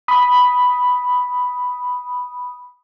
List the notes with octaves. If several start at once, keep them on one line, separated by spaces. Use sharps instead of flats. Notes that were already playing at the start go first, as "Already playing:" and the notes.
B5 D#6